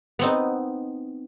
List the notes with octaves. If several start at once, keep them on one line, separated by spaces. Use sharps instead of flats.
B3 C4 D#4